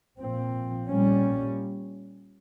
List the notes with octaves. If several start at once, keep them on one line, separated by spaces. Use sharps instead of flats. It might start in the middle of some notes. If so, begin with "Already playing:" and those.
A#2 F3 C4
A#2 G3 C#4